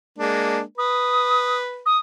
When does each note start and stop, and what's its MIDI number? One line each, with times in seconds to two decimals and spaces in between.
0.18 0.60 56
0.18 0.60 58
0.18 0.60 62
0.78 1.84 71
0.78 1.58 87
1.86 1.98 87